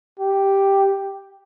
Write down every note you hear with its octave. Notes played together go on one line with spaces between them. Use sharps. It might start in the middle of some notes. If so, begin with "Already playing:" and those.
G4